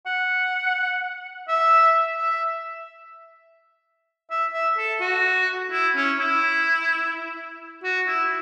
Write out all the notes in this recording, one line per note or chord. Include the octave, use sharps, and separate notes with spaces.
F#5
E5
E5
E5
E5
A4
F#4
E4
C#4
E4
F#4
E4